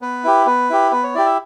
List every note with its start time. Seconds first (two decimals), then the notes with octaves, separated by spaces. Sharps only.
0.02 B3 B4
0.24 E4 G4
0.46 B3 B4
0.70 E4 G4
0.92 B3 B4
1.04 C#5
1.15 E4 G4 D5
1.26 E5